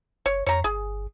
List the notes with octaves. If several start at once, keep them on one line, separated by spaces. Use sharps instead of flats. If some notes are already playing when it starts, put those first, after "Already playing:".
F#1 C#5
F2 C#5 A#5
G1 G#4